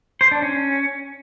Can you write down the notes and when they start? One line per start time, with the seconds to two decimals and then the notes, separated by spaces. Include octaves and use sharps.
0.21 C5
0.31 D4
0.42 C#4